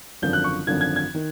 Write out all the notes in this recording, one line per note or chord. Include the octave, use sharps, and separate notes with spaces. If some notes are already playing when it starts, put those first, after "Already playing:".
G#1 F#2 D3 F3 G6
F#6
C#6
G#1 F#2 D3 F3 G#6
G#6
G#6
D#3